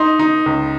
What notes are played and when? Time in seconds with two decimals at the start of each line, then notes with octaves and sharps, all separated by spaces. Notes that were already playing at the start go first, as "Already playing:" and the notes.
Already playing: D#4 C6
0.19 D#4
0.46 C#2